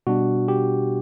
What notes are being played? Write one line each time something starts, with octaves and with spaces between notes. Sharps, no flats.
B2 G3 D4 F#4
G4